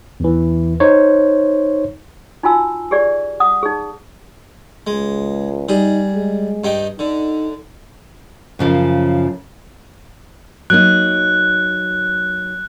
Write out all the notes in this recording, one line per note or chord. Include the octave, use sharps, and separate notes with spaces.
E2 E3
D#4 C5 C#5
D#4 F4 F#4 G#5 E6
G4 G#4 D5
F#5 D#6
D#4 G#4
C#2 G#3
G3 D#4 G#4
G#3
G2 D#4 G5
D3 D#4
F#2 C#3 F3
F#3 A#3 D#4 F#6